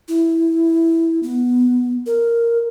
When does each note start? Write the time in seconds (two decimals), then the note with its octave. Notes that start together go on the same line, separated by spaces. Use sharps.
0.08 E4
1.23 B3
2.06 A#4